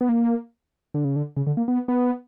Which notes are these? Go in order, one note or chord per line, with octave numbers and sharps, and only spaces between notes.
B3
A#3
D3
C#3
D3
C#3
D3
A#3
B3
B3